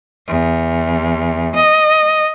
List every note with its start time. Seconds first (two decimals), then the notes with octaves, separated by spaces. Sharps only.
0.27 E2
1.55 D#5